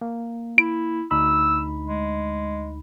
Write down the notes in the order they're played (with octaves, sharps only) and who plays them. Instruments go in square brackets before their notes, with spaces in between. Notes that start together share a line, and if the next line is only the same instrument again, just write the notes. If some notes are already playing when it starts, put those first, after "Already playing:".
[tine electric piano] A#3
[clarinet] E4 [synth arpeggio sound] D7
[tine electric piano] D2 D#4 B5 [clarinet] E6
[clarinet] G#3